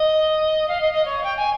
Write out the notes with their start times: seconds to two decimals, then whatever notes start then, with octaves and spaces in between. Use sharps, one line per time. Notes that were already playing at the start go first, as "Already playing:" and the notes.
Already playing: D#5
0.68 F5
0.80 D#5
0.92 D#5
1.05 C#5
1.23 G5
1.37 G#5